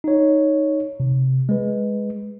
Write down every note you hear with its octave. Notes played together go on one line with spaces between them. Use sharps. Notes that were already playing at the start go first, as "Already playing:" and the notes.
D#4 C#5
C3
G#3 B4